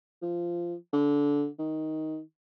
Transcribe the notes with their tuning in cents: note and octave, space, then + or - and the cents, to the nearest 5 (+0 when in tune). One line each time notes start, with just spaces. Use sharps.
F3 -15
D3 -20
D#3 +10